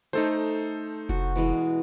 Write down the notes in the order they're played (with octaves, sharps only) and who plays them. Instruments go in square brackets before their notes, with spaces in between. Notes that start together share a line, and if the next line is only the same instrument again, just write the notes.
[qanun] A3 [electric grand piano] D#4 A4 C5
[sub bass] F1 [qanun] F#4
[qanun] B2 E3 G#3